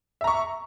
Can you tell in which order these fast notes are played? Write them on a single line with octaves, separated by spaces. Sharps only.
E5 A#5 C#6